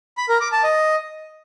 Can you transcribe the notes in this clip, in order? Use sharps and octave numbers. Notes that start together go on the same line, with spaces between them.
B5
A#4
D6
A5
D#5